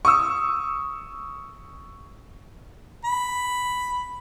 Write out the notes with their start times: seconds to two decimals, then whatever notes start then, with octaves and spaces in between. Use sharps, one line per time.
0.05 C#6 D#6 E6
3.05 B5